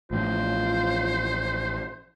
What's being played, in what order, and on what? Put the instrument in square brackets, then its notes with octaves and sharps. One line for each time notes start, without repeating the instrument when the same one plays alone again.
[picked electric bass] A1 A2 F3 [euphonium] F4 [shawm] C5